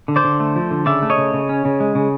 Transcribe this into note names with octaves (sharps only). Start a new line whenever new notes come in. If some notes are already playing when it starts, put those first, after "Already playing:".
D3
C5 D5
D3
A3
F3
D3
C#3 D5 E5
A3
C#5 D#5
C#3
C#3
C#4
C#3
G#3
C#3